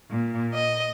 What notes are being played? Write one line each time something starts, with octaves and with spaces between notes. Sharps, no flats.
A#2
D#5